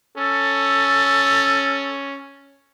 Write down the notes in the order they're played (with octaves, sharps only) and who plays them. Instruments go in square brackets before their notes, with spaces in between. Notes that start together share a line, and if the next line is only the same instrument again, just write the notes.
[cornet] C#4 [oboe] A4